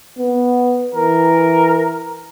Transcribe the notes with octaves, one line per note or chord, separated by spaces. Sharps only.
B3
E3 A#4